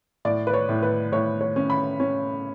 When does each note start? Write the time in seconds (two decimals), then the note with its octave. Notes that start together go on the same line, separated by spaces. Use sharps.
0.25 A2 D5
0.47 B4
0.53 C#5
0.69 A2
0.82 B4
1.12 A2 C#5
1.41 C#5
1.56 C#4
1.70 B5
2.00 C#4